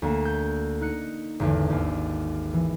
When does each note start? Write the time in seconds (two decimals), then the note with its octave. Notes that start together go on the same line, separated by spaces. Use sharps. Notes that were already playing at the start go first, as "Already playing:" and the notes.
0.02 D2 A#3 E7
0.25 G6
0.81 D#4 F#6 C#7
1.40 G#1 E2 D3
1.70 D#2
2.54 E3